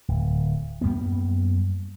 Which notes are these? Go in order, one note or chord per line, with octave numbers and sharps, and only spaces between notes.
D1
F#2 G3 A#3 B3